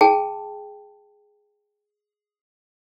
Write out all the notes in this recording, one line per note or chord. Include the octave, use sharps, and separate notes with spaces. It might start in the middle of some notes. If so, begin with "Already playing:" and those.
G#4 G5 A5